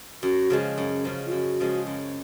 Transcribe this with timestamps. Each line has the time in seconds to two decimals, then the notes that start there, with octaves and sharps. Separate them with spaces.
0.23 F#2 F#4
0.50 C#3 F3 G#3
0.78 F#2
1.05 C#3 F3 G#3
1.27 F4
1.32 F#2 F#4
1.59 C#3 F3 G#3
1.87 F#2